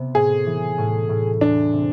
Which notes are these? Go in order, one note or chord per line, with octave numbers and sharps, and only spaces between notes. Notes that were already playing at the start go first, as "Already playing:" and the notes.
Already playing: C3 B3
A2 G#4
E3
A2
A2
E2 D4
C3